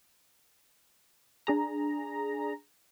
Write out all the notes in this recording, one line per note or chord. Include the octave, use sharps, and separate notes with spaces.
D4 G#4 A#5